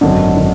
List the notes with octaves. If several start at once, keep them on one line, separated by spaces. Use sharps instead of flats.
G#1 F#2 D3
D3